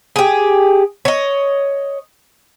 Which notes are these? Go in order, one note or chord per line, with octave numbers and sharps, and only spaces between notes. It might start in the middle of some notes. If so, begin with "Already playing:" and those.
G4 G#4
C#5 D#5